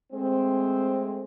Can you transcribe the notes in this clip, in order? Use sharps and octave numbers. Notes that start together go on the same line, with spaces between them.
G#3 A3 C4